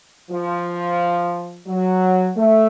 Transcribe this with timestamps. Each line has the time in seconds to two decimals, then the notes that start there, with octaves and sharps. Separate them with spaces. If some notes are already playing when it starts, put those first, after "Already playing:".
0.31 F3
1.67 F#3
2.36 A3